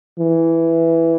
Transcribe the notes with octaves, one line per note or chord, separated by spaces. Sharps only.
E3